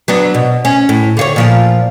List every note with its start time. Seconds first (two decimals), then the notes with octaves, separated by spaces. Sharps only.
0.08 F#3 B3 D4
0.34 B2
0.65 C#4
0.89 A2
1.17 D3 F4 C#5
1.36 A#2 F3 F4